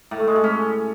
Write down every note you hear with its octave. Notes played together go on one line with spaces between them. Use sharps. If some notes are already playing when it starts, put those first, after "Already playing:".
A2
A3
G#3
A2
C#4